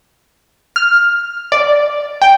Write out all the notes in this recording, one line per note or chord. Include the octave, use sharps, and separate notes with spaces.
F6
D5
G5